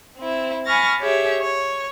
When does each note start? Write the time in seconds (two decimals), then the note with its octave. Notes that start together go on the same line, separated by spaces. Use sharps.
0.17 C4 E4
0.65 G#5 B5 C#6 F6 A6 A#6
0.99 G4 G#4 C#5 E5
1.41 C#5